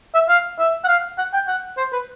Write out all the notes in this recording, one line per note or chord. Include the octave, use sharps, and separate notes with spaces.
E5
F5
E5
F#5
F5
F#5
G5
F#5
C5
B4